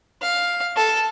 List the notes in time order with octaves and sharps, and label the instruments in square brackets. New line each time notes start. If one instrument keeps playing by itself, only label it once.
[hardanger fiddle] F5
A4